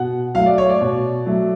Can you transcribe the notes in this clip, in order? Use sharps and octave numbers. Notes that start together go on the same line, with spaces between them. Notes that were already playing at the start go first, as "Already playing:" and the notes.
Already playing: B2 F#5
F#3 A3 F5
D5
C#5
D5
B2
F#3 A3